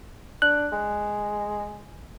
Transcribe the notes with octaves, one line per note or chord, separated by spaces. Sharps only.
D4 F#6
G#3